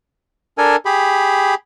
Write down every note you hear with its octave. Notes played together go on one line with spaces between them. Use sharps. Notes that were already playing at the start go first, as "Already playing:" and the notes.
D4 A4 A#4 G#5
G4 G#4 B5